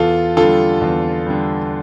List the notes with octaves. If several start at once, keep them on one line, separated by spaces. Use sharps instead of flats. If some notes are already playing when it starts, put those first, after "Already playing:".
Already playing: E2 F4 A4
D3 G3 F4 A4
E2
D3 G3